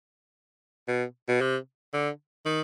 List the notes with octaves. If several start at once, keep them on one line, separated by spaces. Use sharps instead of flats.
B2
B2
C3
D3
D#3